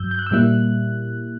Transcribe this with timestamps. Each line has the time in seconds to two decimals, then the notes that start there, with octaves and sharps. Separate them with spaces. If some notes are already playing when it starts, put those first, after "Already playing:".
Already playing: G2 F#3 E6 G6
0.11 G6
0.19 F#6
0.26 E6
0.31 A#2 G3 A#3 E4 F#6